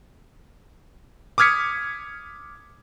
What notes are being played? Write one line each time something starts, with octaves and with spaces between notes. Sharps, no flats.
D6 D#6 F6 G#6 B6 C#7